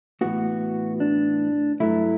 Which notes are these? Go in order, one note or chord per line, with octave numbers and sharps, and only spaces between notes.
A2 E3 B3 F#4
D4
G2 F#3 A3 E4